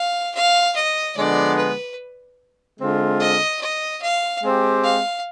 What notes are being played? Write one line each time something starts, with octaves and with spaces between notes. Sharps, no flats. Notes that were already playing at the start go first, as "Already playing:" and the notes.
Already playing: F5
F5
D#5
D3 F3 G#3 B3 D5
B4
D3 G#3 C4 F4
D#5
D#5
F5
G#3 C4 G4
F5